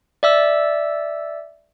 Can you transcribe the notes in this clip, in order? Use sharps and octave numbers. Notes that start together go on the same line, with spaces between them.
D5 E5 E6